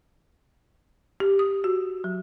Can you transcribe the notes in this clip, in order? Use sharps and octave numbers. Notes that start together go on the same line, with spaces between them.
G4
D#6
F#4
F#3